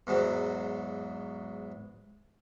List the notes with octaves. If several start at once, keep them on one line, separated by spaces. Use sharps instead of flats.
E2 G#2 F#3